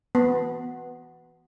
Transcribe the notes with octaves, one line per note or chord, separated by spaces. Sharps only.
B3